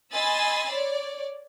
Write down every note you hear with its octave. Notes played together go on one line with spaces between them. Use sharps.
D#5 G#5 B5 C6 E6 A6
C#5 D5